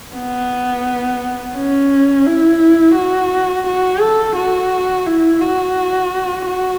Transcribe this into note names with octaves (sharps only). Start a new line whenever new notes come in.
B3
C#4
E4
F#4
F#4
A4
F#4
E4
F#4
F#4